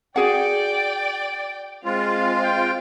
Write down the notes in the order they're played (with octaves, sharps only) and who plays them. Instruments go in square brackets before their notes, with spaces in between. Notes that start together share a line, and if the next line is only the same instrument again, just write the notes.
[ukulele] F#4 G#4 F#5 [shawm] D5 [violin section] G5
[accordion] G#3 F4 [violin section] C4 F5
[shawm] G5